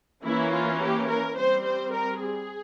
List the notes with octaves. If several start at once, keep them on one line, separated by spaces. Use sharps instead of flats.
E3 A#3 C#4 E4
F4
G4
A#4
G3 C4 C5
C5
A#4
G#4